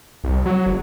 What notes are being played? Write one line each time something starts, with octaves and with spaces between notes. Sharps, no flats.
C2
F#3
F#1